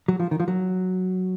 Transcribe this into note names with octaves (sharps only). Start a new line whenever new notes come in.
F#3
F3
D#3
F3
F#3